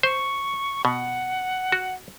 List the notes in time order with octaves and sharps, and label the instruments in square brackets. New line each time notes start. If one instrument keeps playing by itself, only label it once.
[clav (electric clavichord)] C5 [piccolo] C#6
[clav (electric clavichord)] B2 [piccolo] F#5
[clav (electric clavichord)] F#4